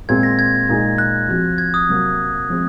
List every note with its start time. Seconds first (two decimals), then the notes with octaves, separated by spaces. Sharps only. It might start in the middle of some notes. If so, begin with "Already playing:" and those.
0.09 A#2 G#3 C4 G#6
0.23 A#6
0.39 G#6
0.69 A#2 G#3 D#4 G#4
0.98 F#6
1.29 F3 C4 F#4
1.58 G#6
1.74 D#6
1.89 C3 F#3 A#3
2.50 F3 G#3 C4